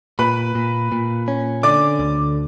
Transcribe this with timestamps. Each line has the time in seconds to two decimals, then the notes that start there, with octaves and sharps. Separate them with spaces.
0.19 A#2 B4 B5
0.55 A#2
0.92 A#2
1.28 C#4
1.63 D3 D5 D6
1.99 D2